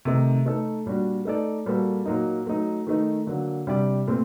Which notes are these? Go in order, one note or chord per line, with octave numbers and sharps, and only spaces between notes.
C3 D#3 A3 D#4
A3 D#4 A4
A#2 G3 D4 F#4
A3 D#4 A4 D5
A#2 G3 A#3 F#4 A4
A#2 F#3 A#3 D#4
F#3 A3 D#4
D#3 A3 D#4
D3 F#3 A#3
C3 G3 D4 G4 D5
A#2 A3 C4